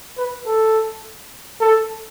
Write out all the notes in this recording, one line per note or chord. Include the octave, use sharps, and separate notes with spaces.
B4
A4
A4